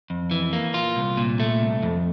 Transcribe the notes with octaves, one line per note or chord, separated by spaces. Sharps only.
F2
E3
A#3
F4
C2
A#2
A3
C2
F2